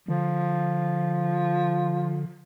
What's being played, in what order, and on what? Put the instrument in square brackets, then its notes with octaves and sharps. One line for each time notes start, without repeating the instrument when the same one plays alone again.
[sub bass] D3 [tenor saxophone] F3